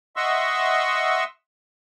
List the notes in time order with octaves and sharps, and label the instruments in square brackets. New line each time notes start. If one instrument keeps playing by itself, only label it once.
[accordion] D#5 E5 F#5 C6 C#6 E6